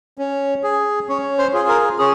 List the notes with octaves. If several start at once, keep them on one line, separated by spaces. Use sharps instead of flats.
C#4
G#4
C#4 C#5
C5
F4 G#4
A#4
C#4 G#4